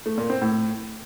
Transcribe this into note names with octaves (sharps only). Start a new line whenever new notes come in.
A3
A#2
C4
A2